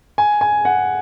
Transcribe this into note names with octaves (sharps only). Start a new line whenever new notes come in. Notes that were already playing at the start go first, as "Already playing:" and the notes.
G#5
G#5
F#5